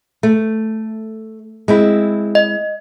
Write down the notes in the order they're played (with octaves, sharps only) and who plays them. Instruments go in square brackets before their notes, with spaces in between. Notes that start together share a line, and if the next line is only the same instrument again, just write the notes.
[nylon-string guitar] A3
G#3 C4 E4
[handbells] D#5